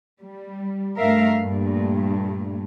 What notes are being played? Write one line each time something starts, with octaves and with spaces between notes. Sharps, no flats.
G3
G2 A3 A#4 E5 F5
G2 A#2 A3